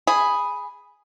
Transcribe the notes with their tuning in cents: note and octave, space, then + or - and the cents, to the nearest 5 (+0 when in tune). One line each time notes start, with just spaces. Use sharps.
G#4 +0 B5 +0